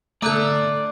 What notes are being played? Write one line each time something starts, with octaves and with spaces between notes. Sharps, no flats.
D3 A3 A4 D5 A#5 D6 F#6 G6